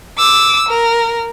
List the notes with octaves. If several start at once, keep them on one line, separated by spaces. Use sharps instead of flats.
D6 E6
A#4